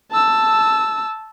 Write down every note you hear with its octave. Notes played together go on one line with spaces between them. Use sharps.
A5 E6